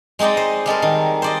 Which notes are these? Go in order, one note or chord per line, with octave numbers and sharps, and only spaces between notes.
G#3 C4 D#4 D5 D#5
C5
G3 G#3 A4 A#4
D#3
C5 D5 D#5